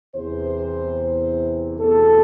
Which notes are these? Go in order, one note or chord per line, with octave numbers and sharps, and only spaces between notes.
E2 C3 E3 C5
E2 B2 A3 C4 A4